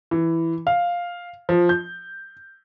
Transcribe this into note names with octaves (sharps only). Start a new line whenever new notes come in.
E3
F5
F3
G6